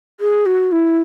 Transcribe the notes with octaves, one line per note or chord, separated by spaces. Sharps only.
G#4
F#4
E4